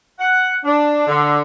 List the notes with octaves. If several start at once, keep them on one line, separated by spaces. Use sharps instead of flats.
F#5
D4
D3